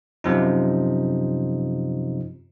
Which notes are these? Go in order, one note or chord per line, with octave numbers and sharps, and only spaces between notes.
F#2 C3 F3 D#4